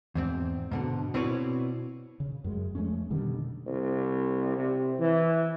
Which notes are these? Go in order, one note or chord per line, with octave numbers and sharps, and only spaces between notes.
E2 G#2 C4
G#2 B2 D3
B2 C4 E4 B4 C#5 D5
C#3
F#2 G#3
F2 G#3 A3 C#4
B2 D3 D#3 G3
C2
C3
E3